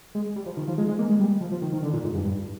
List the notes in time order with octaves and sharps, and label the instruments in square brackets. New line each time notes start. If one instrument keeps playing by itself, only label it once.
[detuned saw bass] G#3
G3
F3
D#3
F3
G#3
G#3
A#3
G#3
G3
F3
F3
D#3
D#3
D3
A#2
G#2
G2
G2